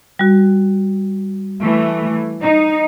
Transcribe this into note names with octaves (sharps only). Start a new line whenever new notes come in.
G3 F#4
E3 A3
D#4